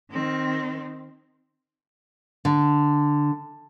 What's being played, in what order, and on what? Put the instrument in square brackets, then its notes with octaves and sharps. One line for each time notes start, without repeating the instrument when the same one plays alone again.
[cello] D#3 C4
[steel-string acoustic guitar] D3